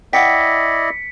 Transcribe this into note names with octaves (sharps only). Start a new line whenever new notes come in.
E4 D5 D#5 F#5 G5 B6 C#7